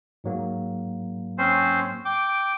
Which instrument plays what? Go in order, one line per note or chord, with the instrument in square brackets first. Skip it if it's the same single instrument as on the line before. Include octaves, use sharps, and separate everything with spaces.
[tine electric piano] G#2 F#3 A#3
[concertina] C4 C#4 C5
G5 D6